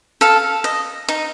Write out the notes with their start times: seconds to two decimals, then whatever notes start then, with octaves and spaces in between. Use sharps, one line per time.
0.21 A4 F5
0.64 D#5
1.08 D#4